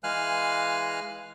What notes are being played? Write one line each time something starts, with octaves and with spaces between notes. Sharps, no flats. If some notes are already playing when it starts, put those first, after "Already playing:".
E3 G#3 F5 G#5 F6 F#6